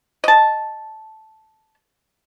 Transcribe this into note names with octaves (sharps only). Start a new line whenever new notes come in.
D#5 A5